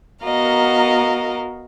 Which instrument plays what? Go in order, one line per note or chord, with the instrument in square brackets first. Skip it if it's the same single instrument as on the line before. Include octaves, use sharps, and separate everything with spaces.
[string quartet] B3 F#4 A#4 D#5 F5 A#5